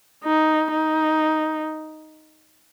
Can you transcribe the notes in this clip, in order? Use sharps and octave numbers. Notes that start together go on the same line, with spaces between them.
D#4
D#4